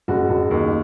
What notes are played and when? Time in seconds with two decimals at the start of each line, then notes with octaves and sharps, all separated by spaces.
0.08 F#1 F#4
0.29 F#1
0.51 D#2